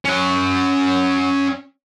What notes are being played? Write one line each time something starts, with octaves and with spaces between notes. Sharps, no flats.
C#4 F#5